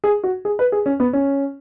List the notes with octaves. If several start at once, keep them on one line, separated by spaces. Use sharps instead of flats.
G#4
F#4
G#4
B4
G#4
C#4
B3
C#4